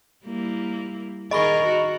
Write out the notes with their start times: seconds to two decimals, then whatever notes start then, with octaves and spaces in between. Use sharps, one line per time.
0.25 G3 A#3 E4
1.31 D#3 G#4 A#4 D#5 B5 C#6
1.67 F#4